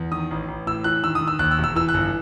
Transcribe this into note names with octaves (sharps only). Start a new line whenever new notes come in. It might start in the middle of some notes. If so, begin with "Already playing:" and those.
Already playing: E2
D#3 D#6
A1
A1
A2 E6
E3 F#6
D#3 E6
D#6
D#3
E6
D#2 F#6
E6
E1
E6
E3 E6
F#6
G1